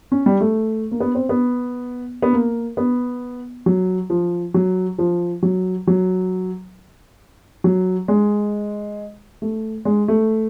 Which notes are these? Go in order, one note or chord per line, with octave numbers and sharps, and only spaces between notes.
C#4
G3
A3
A#3
B3
C4
B3
B3
A#3
B3
F#3
F3
F#3
F3
F#3
F#3
F#3
G#3
A3
G#3
A3